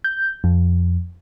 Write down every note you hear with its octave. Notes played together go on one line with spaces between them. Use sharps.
G6
F2